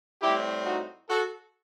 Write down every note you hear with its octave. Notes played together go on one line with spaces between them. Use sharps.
A2 G3 C4 E4 G4
D#4 F#4
F#4 A4